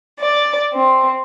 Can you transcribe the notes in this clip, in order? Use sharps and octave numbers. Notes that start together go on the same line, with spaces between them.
D5
C4